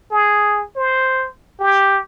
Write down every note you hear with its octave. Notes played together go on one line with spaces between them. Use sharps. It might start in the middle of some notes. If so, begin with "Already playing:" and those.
G#4
C5
G4